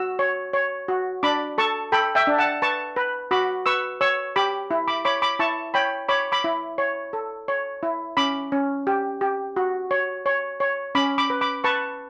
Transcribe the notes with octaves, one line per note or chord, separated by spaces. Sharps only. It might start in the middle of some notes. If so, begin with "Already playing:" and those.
Already playing: F#4 E6
C#5
C#5
F#4
D4 B5 D6
A4 A5 C#6
A4 G5 B5
E5 G5
D4
F#5 A5
B4 A5 C#6
B4
F#4 B5 D6
B4 C#6 E6
C#5 C#6 E6
G4 B5 D6
E4
B5 D6
C#5 B5 D6
B5 D6
E4 A5 C#6
C#5 G5 B5
C#5 B5 D6
B5 D6
E4
C#5
A4
C#5
E4
C#4 B5 D6
C#4
G4
G4
F#4
C#5
C#5
C#5
C#4 B5 D6
B5 D6
B4
B5 D6
B4 A5 C#6